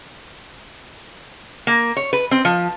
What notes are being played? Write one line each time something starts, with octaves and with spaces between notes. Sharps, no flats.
A#3
C#5
B4
C4
F3